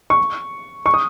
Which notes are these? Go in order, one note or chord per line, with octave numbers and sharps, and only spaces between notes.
C#6
C#6
D#6